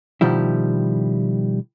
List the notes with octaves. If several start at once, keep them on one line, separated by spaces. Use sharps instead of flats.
B2 D#3 F3 G3 E4